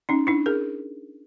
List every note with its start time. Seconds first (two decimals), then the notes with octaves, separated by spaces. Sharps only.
0.09 C#4 D#4
0.27 D4 E4
0.46 G#4 A#4